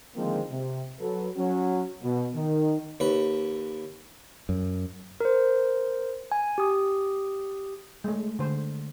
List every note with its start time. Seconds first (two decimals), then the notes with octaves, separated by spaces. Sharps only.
0.16 D3 D#3 F3 G#3 A#3 C4
0.50 C3
1.00 F#3 A4 B4
1.37 F#3 C#4 F#4
2.03 B2
2.35 D#3
3.00 D#2 B4
4.49 F#2
5.20 A#4 C5
6.32 G#5
6.58 G4 D#6
8.04 G#3 A3
8.39 D3 C5